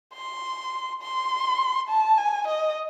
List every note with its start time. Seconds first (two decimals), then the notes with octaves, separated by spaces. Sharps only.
0.14 C6
1.02 C6
1.89 A5
2.18 G#5
2.47 D#5